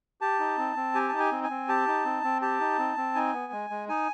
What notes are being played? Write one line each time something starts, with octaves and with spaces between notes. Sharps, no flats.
G4 A5
D#4
C4
C4
G4 G#5
D#4 A5
G#5
C4
G#5
C4
G4 A5
D#4
C4
C4
G4 A5
D#4
C4
C4
D#4 G#5
B3
G#3
G#3
D#4 G#5